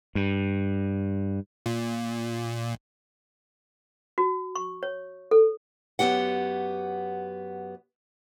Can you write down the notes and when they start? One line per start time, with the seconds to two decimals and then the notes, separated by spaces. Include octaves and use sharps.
0.15 G2
1.66 A#2
4.18 F#4
4.55 C#6
4.83 C#5
5.31 A4
5.99 F#2 E3 B3 G4 F#5